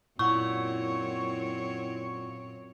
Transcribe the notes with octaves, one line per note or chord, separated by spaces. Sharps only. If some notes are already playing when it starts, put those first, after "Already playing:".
F#2 A#2 C4 E4 C#5 F#5 C#6